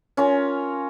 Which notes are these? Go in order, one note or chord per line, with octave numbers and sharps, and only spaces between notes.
C#4 F4 A#4